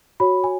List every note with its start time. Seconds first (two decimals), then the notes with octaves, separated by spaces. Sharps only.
0.20 F#4 C#5 B5
0.44 G#5